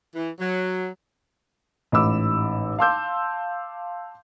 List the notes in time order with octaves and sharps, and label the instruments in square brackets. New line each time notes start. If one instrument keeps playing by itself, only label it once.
[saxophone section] E3
F#3
[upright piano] A1 G#2 D#4 B5 D6 E6
F5 A5 C6 D6 E6 G6